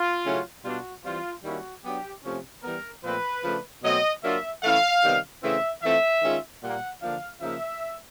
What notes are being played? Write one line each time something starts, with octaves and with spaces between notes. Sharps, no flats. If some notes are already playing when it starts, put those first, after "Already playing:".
Already playing: F4
C#3 F#3 A3 C#4 E4
B2 G3 B3 D4 F4 F#4
E3 G3 C4 F4
D#3 G3 A#3 C#4 E4 F#4
F#3 B3 D4 G4
C3 F3 A3 C#4
E3 G3 B3 A#4
A#2 F3 A3 C4 B4
C#3 F3 A3 D4
B2 F#3 A3 C4 D#5
F#3 A#3 D4 F4 E5
E3 A3 C#4 E4 F5
C3 D#3 G3 B3
C#3 E3 A3 C4 E5
E3 A3 C4 F4 E5
D#3 G#3 C#4 F4
A#2 G3 A#3 F#5
D3 F3 A#3 D4 F5
C#3 F3 A#3 D#4 E5